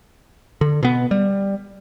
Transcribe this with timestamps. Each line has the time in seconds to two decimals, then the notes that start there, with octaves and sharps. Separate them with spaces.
0.61 D3
0.83 B2 B3
1.11 G3